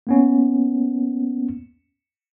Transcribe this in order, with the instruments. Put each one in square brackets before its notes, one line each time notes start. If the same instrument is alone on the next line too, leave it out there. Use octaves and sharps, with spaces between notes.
[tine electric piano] A#3 B3 C#4